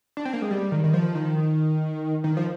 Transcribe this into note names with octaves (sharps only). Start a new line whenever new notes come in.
D4
C4
A#3
G#3
G3
D#3
D#3
F3
D#3
D#3
F3